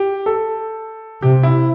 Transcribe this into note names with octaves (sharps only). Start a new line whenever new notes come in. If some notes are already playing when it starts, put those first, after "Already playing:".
Already playing: G4
A4
C3 G4
E4